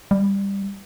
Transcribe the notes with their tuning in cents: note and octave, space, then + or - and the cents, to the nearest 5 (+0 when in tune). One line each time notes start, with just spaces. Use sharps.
G3 +15